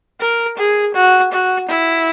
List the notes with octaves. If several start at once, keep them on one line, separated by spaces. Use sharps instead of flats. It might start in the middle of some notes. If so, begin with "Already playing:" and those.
A#4
G#4
F#4
F#4
E4